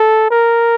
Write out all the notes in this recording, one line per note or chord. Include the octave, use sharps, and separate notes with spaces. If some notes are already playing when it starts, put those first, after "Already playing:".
Already playing: A4
A#4